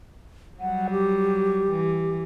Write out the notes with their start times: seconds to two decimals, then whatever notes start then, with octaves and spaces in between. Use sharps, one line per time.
0.60 F#3 G3 F#5
0.91 G4
1.70 E3